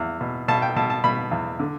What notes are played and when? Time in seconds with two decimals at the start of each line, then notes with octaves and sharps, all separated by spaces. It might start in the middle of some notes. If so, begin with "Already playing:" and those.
Already playing: E2
0.21 B2
0.48 B2 A5
0.62 G5
0.76 B2 A5
0.90 A5
1.04 B2 B5
1.31 E2
1.59 D3